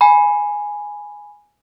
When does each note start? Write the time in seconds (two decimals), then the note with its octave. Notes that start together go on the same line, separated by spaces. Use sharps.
0.01 G#5 B5